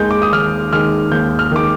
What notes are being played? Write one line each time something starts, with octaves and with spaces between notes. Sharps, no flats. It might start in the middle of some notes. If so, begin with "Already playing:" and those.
Already playing: D#2 D#3 G#3 G6
D6
D#6
D#2 F6
D#3 G#3 F6
D#2 G6
F6
D#3 G#3 D6